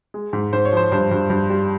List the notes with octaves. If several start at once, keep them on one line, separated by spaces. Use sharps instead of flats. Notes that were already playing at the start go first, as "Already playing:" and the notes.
G#3
G#2
G#2 C5
C#5
F3 C5
G2 C5
G2
G2
G3